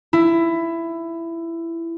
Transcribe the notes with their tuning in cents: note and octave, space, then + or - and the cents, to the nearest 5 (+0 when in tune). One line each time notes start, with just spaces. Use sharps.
E4 +15